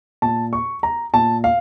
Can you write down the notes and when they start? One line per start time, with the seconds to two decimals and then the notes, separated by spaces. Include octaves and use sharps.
0.22 A#2 A5
0.53 C#6
0.83 A#5
1.13 A#2 A5
1.44 F5